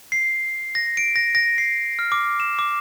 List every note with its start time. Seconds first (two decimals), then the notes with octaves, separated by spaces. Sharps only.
0.12 C7
0.75 A#6
0.97 D7
1.16 A#6
1.35 A#6
1.58 C7
1.99 F6
2.12 D6
2.40 E7
2.59 D6